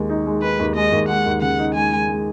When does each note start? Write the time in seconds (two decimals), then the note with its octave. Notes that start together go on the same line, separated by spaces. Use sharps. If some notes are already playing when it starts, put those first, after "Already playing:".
Already playing: D#2 G#3
0.09 D#4
0.26 G#3
0.42 D#4 B4
0.59 D#2
0.76 G#3 D#5
0.92 D#2
1.09 G#3 F#5
1.26 D#2
1.42 C#3 F#5
1.59 D#4
1.74 G#3 G#5
1.92 G#3
2.09 G#3